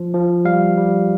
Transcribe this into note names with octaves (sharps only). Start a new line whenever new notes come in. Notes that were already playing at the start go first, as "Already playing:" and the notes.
Already playing: F3
F3
G3 F5
G3